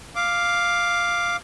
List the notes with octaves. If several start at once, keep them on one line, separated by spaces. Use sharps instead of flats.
F5 D6